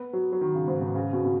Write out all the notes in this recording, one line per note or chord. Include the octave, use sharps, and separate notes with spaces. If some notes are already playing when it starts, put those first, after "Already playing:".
Already playing: B3
F#3
F#3
D#3
C#3
G#2
B2
C#3
B2
B2